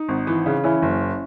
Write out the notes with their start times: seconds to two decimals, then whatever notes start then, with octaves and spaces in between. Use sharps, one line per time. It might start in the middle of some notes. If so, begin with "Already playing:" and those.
Already playing: D#4
0.08 G#1
0.27 E3
0.46 C#3
0.64 E3 C#4 E4
0.82 F#1